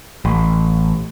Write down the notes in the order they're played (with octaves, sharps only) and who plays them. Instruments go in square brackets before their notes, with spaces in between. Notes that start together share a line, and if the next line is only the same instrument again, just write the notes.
[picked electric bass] A1